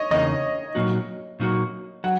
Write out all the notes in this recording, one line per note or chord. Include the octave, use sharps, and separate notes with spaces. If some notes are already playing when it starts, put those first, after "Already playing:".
Already playing: C#5 D#5
E2 C#3 A#3 D#4 D#5
A#2 F#3 A#3 D#4 F#4
A#2 F#3 A#3 D#4 F#4
F#3 F#5